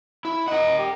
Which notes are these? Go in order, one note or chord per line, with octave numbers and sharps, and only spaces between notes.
E4
A#4 D#5 F#5
G4